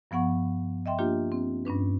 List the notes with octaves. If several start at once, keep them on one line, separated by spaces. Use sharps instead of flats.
G2 F3 B3 F#5 C#6
D#5 E5 G5 C6
A#3 D4 F4 G4
C4
G2 C#4 D4 B4